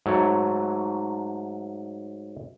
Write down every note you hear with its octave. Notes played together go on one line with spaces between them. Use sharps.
G#2 F#3 A3 C#5